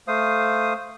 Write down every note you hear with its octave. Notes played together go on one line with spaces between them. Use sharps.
A3 C5 F5 D#6